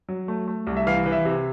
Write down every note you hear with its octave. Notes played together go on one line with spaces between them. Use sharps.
F#3
A3
A3
C2
E5
E3 F5
E3
E5
C3